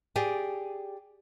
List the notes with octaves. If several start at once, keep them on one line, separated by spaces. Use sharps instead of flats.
G4 G#4 D5